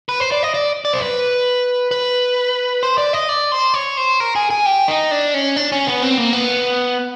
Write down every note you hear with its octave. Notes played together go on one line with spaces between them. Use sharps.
B4
C5
D5
D#5
D5
D5
C5
B4
B4
C5
D5
D#5
D5
C5
C#5
C5
A#4
G#4
G#4
G4
D#4
D4
C#4
D4
C#4
B3
C4
A#3
B3